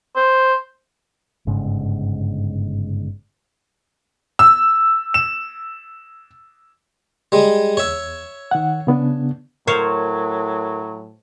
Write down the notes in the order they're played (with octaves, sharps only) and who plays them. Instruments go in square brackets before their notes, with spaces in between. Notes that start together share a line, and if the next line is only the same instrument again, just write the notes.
[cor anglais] C5
[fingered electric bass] G1 G#2 C#3
[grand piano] E6
E7
[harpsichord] G3 G#3
[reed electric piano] E2 [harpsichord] C#5 E5
[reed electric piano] D#3 F#5
C#3 B3 D4
[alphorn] A2 [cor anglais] F#3 [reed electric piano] A#4 [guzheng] C5 C#5 F5